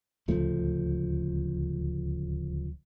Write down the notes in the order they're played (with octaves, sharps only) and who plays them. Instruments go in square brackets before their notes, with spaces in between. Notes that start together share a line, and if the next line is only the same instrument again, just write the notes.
[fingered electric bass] D1 C#2 F3 A3